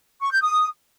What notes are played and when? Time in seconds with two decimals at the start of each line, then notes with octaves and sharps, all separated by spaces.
0.21 C#6
0.32 G6
0.42 D#6